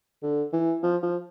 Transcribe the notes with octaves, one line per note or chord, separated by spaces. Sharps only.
D3
E3
F3
F3